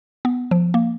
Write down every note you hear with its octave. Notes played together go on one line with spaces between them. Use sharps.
B3
F3
A#3